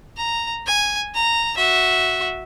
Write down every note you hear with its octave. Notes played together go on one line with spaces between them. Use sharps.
A#5
G#5
A#5
F#4 E5